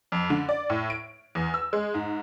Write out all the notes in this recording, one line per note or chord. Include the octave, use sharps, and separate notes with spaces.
F2
D3
D5
A2
D7
E2
E6
G#3
G#2